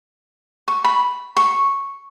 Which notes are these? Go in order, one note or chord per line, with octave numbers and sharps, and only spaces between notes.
C#6
B5
C#6